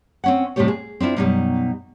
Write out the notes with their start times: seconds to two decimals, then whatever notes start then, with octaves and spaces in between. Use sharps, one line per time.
0.24 C4 C#4 F#5
0.56 A2 C3 G3 A3 G4 C#5
0.68 G#4
1.00 C4 D4 E4 F4
1.16 F#2 B2 G3 A#3 D4 D#4